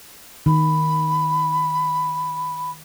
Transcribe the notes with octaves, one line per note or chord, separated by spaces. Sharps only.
D#3 B5